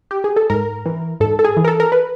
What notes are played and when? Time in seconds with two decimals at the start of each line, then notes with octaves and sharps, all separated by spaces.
0.11 G4
0.24 G#4
0.36 A4
0.50 G#2 A#4
0.86 E3
1.20 G#2 A4
1.39 A4
1.44 G#4
1.57 E3
1.64 A#4
1.68 A4
1.80 A#4
1.92 B4